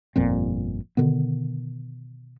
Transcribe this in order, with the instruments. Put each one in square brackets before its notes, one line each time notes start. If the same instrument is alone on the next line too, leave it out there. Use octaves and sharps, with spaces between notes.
[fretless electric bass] G1 F2 A#2 C4
B2 D3 D#3 B3